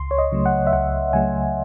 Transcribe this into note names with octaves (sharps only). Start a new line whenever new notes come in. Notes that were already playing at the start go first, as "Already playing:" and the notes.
Already playing: C#2 C6
C#5
D#5
C#3 F#3 A3
F#5
E5
C#2 F#5
C#3 F#3 A3 G#5